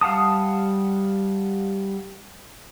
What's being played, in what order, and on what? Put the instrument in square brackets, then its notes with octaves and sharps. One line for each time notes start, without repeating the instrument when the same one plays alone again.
[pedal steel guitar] G3 F5 F#5 A5 D#6